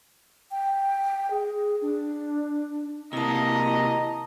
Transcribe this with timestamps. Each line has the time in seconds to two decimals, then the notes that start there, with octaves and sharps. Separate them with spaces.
0.51 G5
1.31 G#4
1.82 D4
3.13 C3 A#3 E4 D#5 A5 A#5